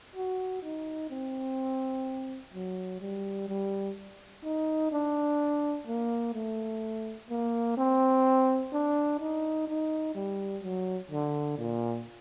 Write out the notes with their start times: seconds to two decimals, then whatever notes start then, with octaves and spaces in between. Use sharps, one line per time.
0.16 F#4
0.63 D#4
1.11 C4
2.54 F#3
3.01 G3
3.49 G3
4.44 D#4
4.92 D4
5.87 A#3
6.34 A3
7.30 A#3
7.77 C4
8.73 D4
9.20 D#4
9.67 D#4
10.15 G3
10.63 F#3
11.11 D3
11.58 A#2